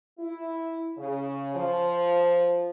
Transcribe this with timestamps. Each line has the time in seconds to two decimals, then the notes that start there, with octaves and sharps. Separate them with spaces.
0.18 E4
0.97 C#3
1.55 F3